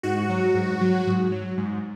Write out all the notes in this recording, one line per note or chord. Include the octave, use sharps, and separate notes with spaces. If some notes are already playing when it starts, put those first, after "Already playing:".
G#2 F#4
F#3
G#2
F#3
G#2
F#3
G#2